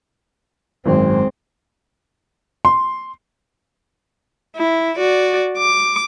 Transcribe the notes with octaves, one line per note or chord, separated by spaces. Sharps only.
G#1 F#2 G#3 C4
C6
E4
F#4 D5
D6